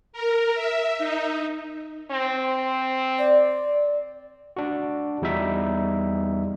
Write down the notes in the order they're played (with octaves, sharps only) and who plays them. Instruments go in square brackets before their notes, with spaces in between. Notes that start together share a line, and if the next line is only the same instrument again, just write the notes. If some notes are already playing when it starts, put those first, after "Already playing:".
[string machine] A#4
E5
D#4
[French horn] C4
[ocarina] D5
[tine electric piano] D4 F#4
E2 G3 D#4 E5